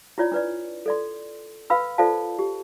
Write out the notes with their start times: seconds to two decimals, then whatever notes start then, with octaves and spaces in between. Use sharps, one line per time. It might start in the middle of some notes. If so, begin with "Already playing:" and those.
0.18 E4 F4 C#5 D5
0.32 D4 B4 D5
0.86 A4 D5 C6
1.70 B4 F5 B5 E6
1.98 F4 A4 C5 D5 F5 A5
2.39 G4